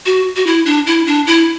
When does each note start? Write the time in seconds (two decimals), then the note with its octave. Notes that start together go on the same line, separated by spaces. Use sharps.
0.06 F#4
0.36 F#4
0.46 E4
0.66 D4
0.87 E4
1.07 D4
1.27 E4